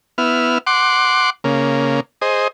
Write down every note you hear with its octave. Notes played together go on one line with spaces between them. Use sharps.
B3 E4 F6
F#5 C6 D6
C#3 A#3
G#4 C5 D#5